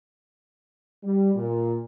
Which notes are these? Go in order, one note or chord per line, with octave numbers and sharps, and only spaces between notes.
G3
A#2